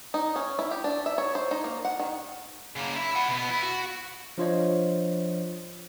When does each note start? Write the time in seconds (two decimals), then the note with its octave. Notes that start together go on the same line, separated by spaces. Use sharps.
0.14 D#4
0.36 C#4
0.59 E4
0.71 G4
0.84 D4
1.06 E5
1.18 C#5
1.35 C5
1.51 D#4
1.64 A#3
1.85 F#5
2.00 D#3
2.77 C#3 A#3
2.96 E4
3.16 F#5 G#5
3.29 B2 B3
3.49 E4
3.62 F#4
4.38 F3 D4 F4 C5 C#5 D#5